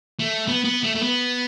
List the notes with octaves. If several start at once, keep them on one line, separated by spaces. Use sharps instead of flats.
A3
B3
B3
A3
A3
B3